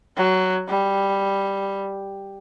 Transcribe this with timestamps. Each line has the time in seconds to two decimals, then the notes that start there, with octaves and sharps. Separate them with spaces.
0.17 F#3
0.68 G3